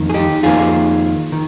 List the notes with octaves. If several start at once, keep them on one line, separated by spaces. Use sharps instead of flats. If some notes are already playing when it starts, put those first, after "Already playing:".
Already playing: F2 D#3 A#3
G#4
D#4 G4
F2 D#3 A#3 F4 G#4
D#3